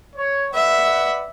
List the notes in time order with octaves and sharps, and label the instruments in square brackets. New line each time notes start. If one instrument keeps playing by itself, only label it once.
[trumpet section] C#5
[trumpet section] B4 D5 F#5 [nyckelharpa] E5